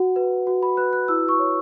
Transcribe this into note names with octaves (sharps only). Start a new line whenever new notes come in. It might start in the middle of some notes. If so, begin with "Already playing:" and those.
Already playing: F#4 F#5
B4
F#4
B5
B4 F#6
F#6
E4 E6
C#6
C#5